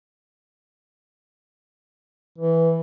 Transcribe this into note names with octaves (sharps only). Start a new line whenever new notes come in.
E3